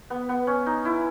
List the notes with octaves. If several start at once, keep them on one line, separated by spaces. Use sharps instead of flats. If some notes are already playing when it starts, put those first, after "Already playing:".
B3
B3
C#4
D#4
E4